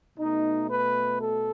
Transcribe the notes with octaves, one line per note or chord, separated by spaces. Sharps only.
B2 A3 D#4
B4
A4